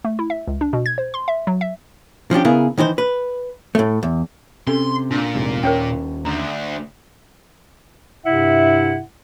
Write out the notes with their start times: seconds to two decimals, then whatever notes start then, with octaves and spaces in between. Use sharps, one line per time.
0.04 A3
0.19 E4
0.30 E5
0.47 C#2
0.61 D4
0.73 B2
0.86 G#6
0.98 C5
1.14 C6
1.28 E5
1.47 F#3
1.61 E5
2.31 F3 C#4 D4 G4
2.44 C#3 B3 E4 G#4 A#4
2.78 D#3 E3 D#4 C5
2.98 B4
3.75 A2 A3
4.03 E2
4.67 C3 C#4 A4 C6
5.11 A#2 D4
5.35 F1 G#2 C3
5.63 D#2 C#4 A#4 C#5 G5
6.25 D2 A#5
8.25 G2 C3 E4 E5 F#5